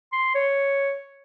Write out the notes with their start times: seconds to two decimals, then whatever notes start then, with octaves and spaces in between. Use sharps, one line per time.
0.12 C6
0.35 C#5